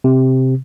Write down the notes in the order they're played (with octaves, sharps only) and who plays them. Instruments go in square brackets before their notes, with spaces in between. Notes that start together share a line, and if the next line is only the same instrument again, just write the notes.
[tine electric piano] C3